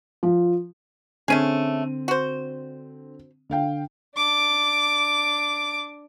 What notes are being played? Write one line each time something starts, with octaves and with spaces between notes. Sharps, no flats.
F3
D3 A3 C4 C#4 G#4 D#7
F#4 C5
D3 F5 G5
D4 D6